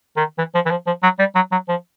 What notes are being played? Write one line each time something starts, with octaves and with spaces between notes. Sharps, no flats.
D#3
E3
F3
E3
F3
F3
F#3
G3
F#3
F#3
F3